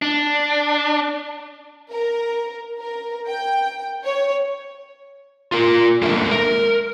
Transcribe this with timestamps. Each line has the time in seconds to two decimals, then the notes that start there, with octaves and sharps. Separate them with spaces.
0.02 D4
1.92 A#4
2.79 A#4
3.28 G5
4.04 C#5
5.52 F4 A#4
6.02 G#3 A#3 D4 A4 A#4 E5
6.31 A#4